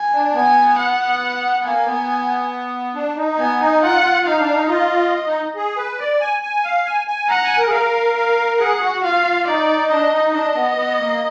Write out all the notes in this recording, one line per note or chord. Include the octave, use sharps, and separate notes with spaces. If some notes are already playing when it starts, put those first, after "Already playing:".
Already playing: G#5
D4
B3 G#5
F#5
A#3 G#5
B3
D4
D#4
B3 G#5
D#4
F4 F#5
D#4 F5
D4
D#4
F4 D#5
D#4
G#4
B4
D5
G#5
G#5
F5
G#5
G#5
F#5 A#5
G#5
A#4
G#4
A#4 F5
F5
G#4 F#5
F#4
F4 F5
D#4 D5
D4 D#5
D#4
D4 D#5
B3
B3
A#3